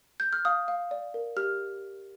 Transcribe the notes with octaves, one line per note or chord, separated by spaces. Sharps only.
G6
F6
F5 D#6
F5
D5
A#4
G4 F6